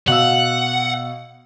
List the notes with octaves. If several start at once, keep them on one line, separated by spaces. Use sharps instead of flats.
B2 F5 F#5 E6